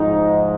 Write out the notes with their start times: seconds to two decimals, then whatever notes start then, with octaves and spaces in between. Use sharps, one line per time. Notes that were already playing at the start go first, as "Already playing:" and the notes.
Already playing: G#2 F3 G#3 D#4